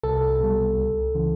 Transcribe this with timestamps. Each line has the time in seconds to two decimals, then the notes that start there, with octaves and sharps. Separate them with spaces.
0.03 C2 A4
0.40 B2 G3
0.77 C#2
1.15 C#3 E3